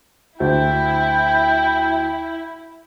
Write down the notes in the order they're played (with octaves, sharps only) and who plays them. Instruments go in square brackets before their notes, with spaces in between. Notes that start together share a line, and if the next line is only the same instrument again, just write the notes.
[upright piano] D2 [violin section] E4 [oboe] G5